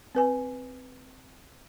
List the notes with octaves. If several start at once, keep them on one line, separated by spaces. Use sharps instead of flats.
C4 B4 G#5